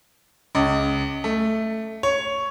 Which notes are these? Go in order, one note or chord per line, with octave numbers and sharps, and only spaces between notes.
C#2
A3
C#5